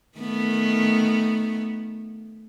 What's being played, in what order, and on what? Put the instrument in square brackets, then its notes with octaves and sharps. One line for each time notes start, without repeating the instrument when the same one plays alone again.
[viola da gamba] D#3 A3 B3